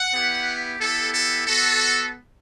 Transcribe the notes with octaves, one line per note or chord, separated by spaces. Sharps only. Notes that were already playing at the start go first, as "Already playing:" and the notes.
Already playing: F#5
B3 E4 G4
B3 E4 G4 A4
A4
B3 F#4 A4